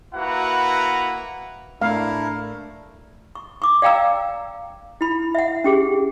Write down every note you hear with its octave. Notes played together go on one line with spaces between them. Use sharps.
A#3 E4 F#4 B4 F#5 A#5
A2 A3 D4 E4 A#4 F5
C#6
C#6 D6
D5 F5 G5 A#5 E6
E4 B5
E5 F#5
C#4 G4 G#4